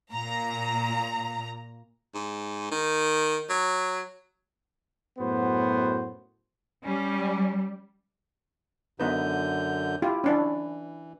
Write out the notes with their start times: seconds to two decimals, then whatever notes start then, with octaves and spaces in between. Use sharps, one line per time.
0.11 A#2 A#5
2.14 G#2
2.71 D#3
3.49 F#3
5.18 F#2 A2 B3 F#4 C5
6.85 G3 C#4
9.00 F#2 D3 B3 D#4 B4 G6
10.02 E4 F4 G4
10.24 E3 C#4 D4 E4